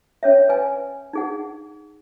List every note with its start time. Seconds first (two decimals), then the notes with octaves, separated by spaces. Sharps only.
0.23 C#4 C#5 E5
0.49 B4 G#5
1.13 D#4 G#4 F#5